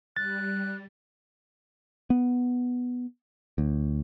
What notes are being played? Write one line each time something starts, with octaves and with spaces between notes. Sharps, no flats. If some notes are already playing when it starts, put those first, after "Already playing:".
G3 F#6 A6
B3
D2